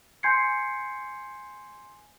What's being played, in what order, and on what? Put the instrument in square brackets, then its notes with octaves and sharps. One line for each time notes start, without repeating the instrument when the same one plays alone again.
[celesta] G#5 C6 G6 G#6 C7 C#7